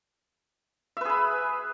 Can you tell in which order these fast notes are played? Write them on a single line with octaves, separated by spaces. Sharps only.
E5 B4 G#4 B5